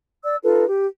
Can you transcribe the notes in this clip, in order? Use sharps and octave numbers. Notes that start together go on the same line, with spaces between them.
D5 E6
D#4 F4 A4 B4
G4